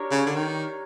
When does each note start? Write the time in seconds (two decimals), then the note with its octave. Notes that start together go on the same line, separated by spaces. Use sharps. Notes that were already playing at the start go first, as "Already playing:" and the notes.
Already playing: D4 G4 A#4 C#5
0.11 C#3
0.27 D3
0.36 D#3